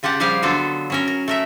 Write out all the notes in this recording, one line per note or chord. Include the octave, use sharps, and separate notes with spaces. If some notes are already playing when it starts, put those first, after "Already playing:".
C#3 F4 G4 F#5 A5
F3 G3 G4 G#4 F5
D3 F#3 B3 F4 A4
F#3 C#4 A#4
A#4
A3 A#4 E5